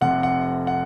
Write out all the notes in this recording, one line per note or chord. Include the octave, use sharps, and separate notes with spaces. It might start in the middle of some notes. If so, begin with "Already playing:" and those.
F1 F2 C3 F#5
F#5
F#5